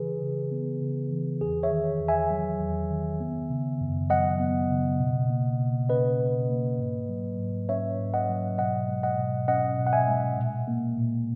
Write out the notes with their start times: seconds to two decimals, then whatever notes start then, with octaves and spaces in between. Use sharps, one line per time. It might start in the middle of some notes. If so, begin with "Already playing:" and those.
Already playing: C#3 E3 G#4 B4
0.22 C#3
0.52 B3
0.81 C#3
1.11 E3
1.41 E2 G#4
1.63 C#5 E5
1.71 D#3
2.00 E2
2.08 E5 G#5
2.31 F#3
2.60 E2
2.91 D#3
3.20 B3
3.50 C#3
3.81 F#2
4.10 F#3 D#5 F#5
4.40 B3
4.70 C#3
5.00 B2
5.30 A#3
5.60 B2
5.89 C#4 B4 D#5
6.20 B2
6.49 A#3
6.79 G#2
7.09 F#3
7.39 G#2
7.69 C#4 C#5 E5
7.99 G#2
8.14 D#5 F#5
8.29 F#3
8.58 B2 D#5 F#5
8.89 G#3
9.03 D#5 F#5
9.18 B2
9.48 C#4 D#5 F#5
9.78 B2
9.87 F#5
9.93 E5 G#5
10.08 G#3
10.38 A#2
10.68 A#3
10.98 A#2